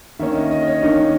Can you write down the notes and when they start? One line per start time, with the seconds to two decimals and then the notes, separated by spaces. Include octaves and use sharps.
0.19 D#3 A#3 C#4 E5
0.35 D#5
0.51 D#5
0.62 D#5
0.67 C#5
0.83 D#3 A#3 C#4 D#4